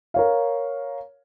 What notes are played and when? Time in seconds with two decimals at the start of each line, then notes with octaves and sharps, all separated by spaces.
0.14 A#4 C#5 F5